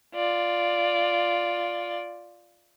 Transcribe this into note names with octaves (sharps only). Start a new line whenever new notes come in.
F4 D5